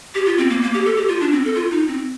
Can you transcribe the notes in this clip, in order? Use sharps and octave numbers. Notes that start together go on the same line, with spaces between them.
G4
F4
C4
A#3
A#3
G4
A4
G4
F4
D4
C4
A4
F4
D#4
C4